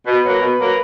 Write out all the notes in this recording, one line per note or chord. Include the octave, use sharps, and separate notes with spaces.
B2 B4
F#3 A#3
B2
F#3 A#3